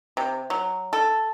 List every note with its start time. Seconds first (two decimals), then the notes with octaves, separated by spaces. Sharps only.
0.17 C3
0.50 F#3
0.93 A4